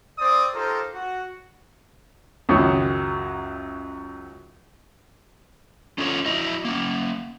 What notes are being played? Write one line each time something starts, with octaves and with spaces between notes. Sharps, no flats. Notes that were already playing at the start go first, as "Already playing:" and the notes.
C4 D5 D#6
D#4 F4 G4 A4 A#4 C5
F#4
C#2 F#2 D#3 F#3
C#4 F4 A4 B4 C#5
E4 F#4 D#5
A#3 C#4